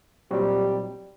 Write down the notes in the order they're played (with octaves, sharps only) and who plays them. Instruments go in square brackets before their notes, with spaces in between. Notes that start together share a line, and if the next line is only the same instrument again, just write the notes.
[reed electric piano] A#2 F#3 C4 D#4 F#4 [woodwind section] G3 G4